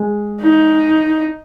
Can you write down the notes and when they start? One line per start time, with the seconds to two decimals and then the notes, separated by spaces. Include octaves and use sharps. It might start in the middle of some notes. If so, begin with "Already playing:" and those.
Already playing: G#3
0.42 D#4